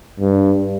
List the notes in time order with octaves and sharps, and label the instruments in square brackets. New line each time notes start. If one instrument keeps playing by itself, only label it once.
[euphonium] G2